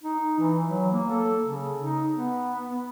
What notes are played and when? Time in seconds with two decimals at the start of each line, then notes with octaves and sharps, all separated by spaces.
0.04 D#4
0.39 E3
0.67 F#3
0.92 A#3
1.10 A4
1.44 C#3
1.82 D#4
2.14 B3